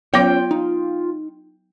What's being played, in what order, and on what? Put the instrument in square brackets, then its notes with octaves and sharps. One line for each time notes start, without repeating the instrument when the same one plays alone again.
[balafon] F#3 B3 [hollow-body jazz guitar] C#4 C5 C#5 [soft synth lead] F4 [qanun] G5
[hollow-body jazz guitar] D#4